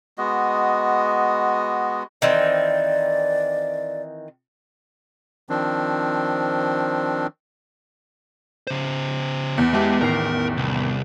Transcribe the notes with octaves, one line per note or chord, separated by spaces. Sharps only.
G#3 B3 F#4 D#5
D#3 E3 C4 D5
D#3 F3 C4 D4
C#3 C5
E2
G#3 G4 E5 A5
A1 D#3 A#4 C7
C2